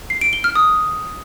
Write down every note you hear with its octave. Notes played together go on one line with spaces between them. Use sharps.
C7
D7
G7
F6
D#6